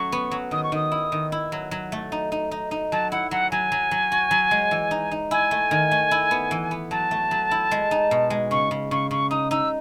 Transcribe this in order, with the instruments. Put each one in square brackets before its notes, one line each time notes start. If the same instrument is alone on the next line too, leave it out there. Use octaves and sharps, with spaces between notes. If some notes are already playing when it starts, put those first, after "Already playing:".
Already playing: [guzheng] F#3 A3 C#4 [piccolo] C#6
[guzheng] B3
F#3
[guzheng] D#3 [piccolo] D#6
[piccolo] C#6
[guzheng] D#3 [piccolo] D#6
[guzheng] E4
D#3
E4
F#3
F#3
A3
D#4
D#4
D#4
D#4
[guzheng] F#3 [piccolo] A5
[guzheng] E4 [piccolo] F#5
[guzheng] F#3 [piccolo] F#5
[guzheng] F#3 [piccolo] G#5
[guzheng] F#3
F#3
F#4
F#3
G#3
E3
D#4
D#4
[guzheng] E4 [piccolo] G#5
[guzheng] A3
D#3
A3
E4
B3
E3
B3
[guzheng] F#3 [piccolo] A5
[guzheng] A3
F#3
E4
G#3
D#4
B2
G#3
[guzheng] C#3 [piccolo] C#6
[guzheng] C#3
[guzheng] C#3 [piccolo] C#6
[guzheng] C#3 [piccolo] C#6
[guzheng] D#4 [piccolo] D#6
[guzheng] D#4 [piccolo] E6